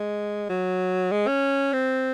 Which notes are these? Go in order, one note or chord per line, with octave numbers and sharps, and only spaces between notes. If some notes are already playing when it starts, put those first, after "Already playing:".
Already playing: G#3
F#3
G#3
C#4
C4